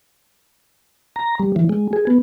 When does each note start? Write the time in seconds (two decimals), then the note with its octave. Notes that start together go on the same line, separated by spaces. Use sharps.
1.16 A#5
1.40 G3
1.56 E3
1.69 G#3
1.93 G#4
2.07 B3